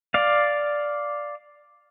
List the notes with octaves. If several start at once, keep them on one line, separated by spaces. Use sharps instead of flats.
D5 F5